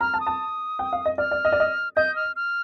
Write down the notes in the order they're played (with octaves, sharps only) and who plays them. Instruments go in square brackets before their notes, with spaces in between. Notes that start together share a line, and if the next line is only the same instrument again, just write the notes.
[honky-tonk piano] A#5 [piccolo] F6
[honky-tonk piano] A5
[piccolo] D#6
[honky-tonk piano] A5
G5
F5
D#5
[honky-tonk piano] D5 [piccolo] F6
[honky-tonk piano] D5
D#5
D5
D#5
[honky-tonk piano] D#5 [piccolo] G6
[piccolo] F6
F6